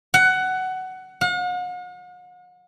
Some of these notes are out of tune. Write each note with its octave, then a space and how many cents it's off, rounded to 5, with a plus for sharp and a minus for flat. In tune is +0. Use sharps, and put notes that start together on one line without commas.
F#5 +15
F#5 -45